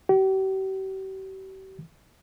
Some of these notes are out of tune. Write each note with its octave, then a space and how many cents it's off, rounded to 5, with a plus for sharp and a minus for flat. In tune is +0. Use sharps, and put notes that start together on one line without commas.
G4 -45